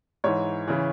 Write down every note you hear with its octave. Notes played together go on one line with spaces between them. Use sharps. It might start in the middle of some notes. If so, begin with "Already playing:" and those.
G#2 E3 C#5
C#3 E3